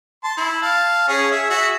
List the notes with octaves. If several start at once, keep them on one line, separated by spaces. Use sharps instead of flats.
A5 C6
E4
F5 A5
C#4 G#4
G#4 E5
F#4 G#4 E5